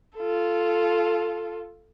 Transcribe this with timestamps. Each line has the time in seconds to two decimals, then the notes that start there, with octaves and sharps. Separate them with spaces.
0.16 F4 A4